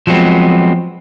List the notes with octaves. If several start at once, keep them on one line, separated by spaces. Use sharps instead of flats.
F3 F#3 G#3 B3 C4